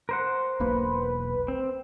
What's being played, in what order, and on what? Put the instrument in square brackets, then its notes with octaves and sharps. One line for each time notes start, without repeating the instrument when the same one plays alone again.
[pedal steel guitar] A#4 C5 F#5
[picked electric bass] E1 B1 A#3 [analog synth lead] B4
[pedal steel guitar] C4